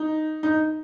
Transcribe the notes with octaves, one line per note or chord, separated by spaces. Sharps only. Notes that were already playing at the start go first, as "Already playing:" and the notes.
Already playing: D#4
D#4